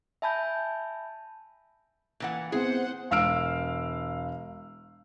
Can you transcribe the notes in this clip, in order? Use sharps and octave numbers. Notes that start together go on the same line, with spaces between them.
E5 G#5 A5 B5 G6
A#2 E3 F#5
B3 C4 E4 G#4 C5 F#5
E1 F5 E6 F6 D7